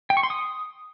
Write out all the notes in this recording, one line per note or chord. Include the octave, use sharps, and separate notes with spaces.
G5
C#6
C6
D#6